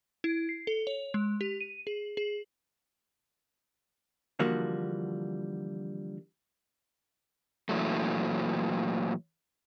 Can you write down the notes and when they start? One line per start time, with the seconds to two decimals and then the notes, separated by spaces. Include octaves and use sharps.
0.24 E4
0.49 C7
0.67 A4
0.87 C#5
1.14 G#3
1.41 G4
1.61 D#7
1.87 G#4
2.17 G#4
4.39 D3 E3 F3 G3 A#3 F#4
7.69 A#2 E3 F#3 A3